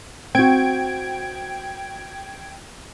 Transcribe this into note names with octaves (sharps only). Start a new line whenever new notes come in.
C4 F#4 G5 G#6 D7